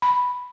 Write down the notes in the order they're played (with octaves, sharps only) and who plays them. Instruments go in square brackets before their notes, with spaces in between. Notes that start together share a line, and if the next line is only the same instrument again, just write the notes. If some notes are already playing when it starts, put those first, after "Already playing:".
[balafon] B5